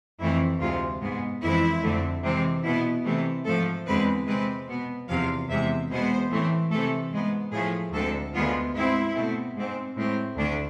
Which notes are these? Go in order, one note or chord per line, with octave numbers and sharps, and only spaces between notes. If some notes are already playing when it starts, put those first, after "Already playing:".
F2 E3 A3 C4 E4
D2 C3 G#3 F4
G#2 G#3 B3
F2 E3 G#3 C4 E4
F2 D3 A3 C4
C3 E3 G#3 C4
B2 B3 E4
C3 E3 A3
G#2 F3 A3 A4
E2 D3 G#3 C4 B4
C3 G#3 C4 B4
B2 B3
E2 C3 F3 F5
E2 C3 G#3 E5
E2 B2 G#3 B3 C5
A2 E3 A3 C4
C3 E3 A3 A4
G#2 G#3 B3
A2 F3 A3 G#4
D2 D3 G#3 C4 A4
D2 D3 G#3 B3 F4
G#2 G#3 C4 E4
B2 A3 C4
G#2 G#3 C4
A2 G#3 C4
D2 D3 A3 D4